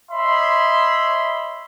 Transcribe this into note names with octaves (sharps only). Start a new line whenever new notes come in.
C#5 D#5 E5 B5 C6